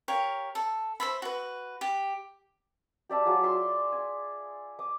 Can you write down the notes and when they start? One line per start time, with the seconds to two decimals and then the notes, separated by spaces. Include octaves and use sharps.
0.08 G4 A#4 C#5 F5
0.55 A4
1.00 C5 E5 B5
1.22 F#4 B4
1.81 G4
3.09 G4 D5 E5 A5
3.25 F#3 F4 F#4 G#4
3.43 E5 F5 C6
3.92 G#5
4.79 D6 D#6